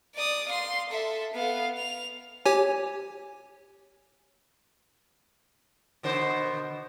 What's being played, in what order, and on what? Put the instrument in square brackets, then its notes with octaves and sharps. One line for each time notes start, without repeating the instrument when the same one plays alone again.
[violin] D5 D#6
F5 C6
A4 E5
B3 F5
F7
[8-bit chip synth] G4 C#5 G#5
[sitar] B2 D3 C5